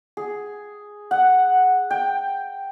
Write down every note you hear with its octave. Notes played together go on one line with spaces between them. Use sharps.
G#4
F#5
G5